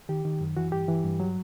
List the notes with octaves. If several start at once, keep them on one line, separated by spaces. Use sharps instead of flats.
D#3 G4
D#3
F#2
E3 F#4
G2 G4
E3
G2
F#3